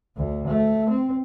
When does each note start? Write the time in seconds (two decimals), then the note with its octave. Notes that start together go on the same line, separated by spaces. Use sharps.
0.16 D2
0.47 A3
0.89 C4